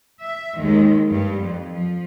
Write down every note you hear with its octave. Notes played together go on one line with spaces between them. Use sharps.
E5
D#2 G#2 D#3 G#3
G2 G3
F2
F3